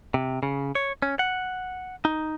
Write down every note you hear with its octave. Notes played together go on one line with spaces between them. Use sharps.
C3
C#3
C#5
C#4
F#5
D#4